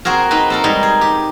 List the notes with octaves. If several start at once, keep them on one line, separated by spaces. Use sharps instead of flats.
C4 F#4 G#4 A#4
C4 D#4 B4
C4 A4 A#4
G3 G#3 D#4
G#4
G4